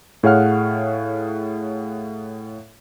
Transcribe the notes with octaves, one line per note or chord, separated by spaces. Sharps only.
A2 G#4 C#5 F5 F#5 F6